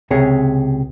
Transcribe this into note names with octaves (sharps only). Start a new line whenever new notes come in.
C#2 C3 G#4 C#5